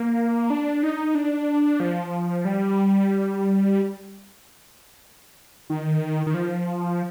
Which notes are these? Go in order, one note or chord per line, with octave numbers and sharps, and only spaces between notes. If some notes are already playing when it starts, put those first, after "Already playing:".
Already playing: A#3
D4
D#4
D4
F3
G3
D#3
D#3
F3